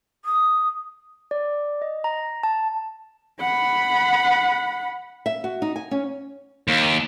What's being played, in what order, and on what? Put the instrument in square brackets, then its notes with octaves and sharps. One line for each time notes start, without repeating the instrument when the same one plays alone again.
[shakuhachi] D#6
[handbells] D5
D#5
A#5
A5
[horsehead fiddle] F#5 B5
[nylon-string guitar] E5
F#4
D#4
G#5
C#4
[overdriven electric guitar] D#2